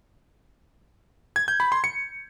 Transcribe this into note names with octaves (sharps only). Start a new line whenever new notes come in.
G#6
G6
B5
C6
C#7